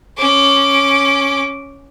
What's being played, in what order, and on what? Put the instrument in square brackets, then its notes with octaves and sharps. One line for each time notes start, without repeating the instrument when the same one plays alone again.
[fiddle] C#4 D6